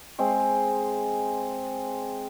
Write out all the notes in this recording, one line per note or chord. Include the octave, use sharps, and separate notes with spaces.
G#3 C4